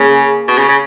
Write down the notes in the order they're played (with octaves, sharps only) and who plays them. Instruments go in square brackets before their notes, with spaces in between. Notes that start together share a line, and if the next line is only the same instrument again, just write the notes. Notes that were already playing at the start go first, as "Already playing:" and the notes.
Already playing: [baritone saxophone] C#3 [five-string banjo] A#3 C#4 G#4
[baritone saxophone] B2
C#3
C#3